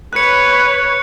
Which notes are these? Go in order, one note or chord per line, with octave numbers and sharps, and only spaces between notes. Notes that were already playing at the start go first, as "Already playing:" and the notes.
B4 C#5 F#6 C#7